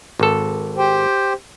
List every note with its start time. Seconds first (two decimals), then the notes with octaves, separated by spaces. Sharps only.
0.19 G#1 A4
0.77 G4 C5 G5